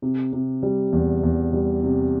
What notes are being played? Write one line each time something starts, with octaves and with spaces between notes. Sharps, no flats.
C3
C3
G3
E2
E2
G3
C3